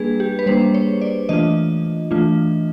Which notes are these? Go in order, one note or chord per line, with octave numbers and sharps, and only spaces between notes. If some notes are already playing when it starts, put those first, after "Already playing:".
Already playing: G3 A#3 D4 G#4 B4
G4
B4
G3 A#3 D4 C5
C#5
D5
E3 A3 D4 F4 D#5
E3 A3 D4 F4